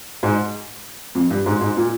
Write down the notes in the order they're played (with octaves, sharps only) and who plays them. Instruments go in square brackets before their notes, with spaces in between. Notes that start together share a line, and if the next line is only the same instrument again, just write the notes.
[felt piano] G#2
F2
G2
G#2
G#2
A#2